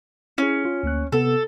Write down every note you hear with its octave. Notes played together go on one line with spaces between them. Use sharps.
C#4 E4 G#4
F4
D2 A#3 F#6
C3 B3 A4